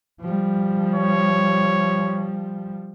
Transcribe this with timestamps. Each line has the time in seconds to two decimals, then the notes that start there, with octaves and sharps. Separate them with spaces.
0.21 F3 G3
0.95 C#5